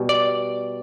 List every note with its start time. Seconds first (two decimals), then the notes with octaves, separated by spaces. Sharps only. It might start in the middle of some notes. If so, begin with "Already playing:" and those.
Already playing: B2 G3
0.09 D5